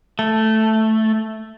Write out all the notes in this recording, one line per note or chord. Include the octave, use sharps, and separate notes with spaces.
A3